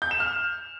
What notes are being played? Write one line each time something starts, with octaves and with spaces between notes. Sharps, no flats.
G6
E7
F6